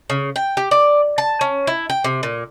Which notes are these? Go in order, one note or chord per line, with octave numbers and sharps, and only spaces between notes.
C#3
G5
G4
D5
A5
C#4
E4
G5
C3
A#2